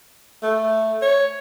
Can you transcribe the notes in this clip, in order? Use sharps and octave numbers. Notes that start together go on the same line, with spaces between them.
A3
C#5